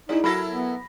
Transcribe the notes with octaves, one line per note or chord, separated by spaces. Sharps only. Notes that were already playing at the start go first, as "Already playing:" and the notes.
G#3 D#4 E4 G#4 D5
F#3 E4 F#4 A4 A#4 B5 A#6
B3